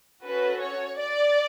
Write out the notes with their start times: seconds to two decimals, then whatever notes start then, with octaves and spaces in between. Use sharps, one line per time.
0.24 C#4 F#4 A4 B4
0.62 C#5
1.00 D5